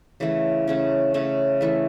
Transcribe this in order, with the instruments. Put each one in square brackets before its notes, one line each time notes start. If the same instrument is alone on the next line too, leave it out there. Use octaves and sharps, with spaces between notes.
[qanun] C#3 E3 A3
C#3 A3 C#4
C#3 A3 C#4
E3 A3 E4 A4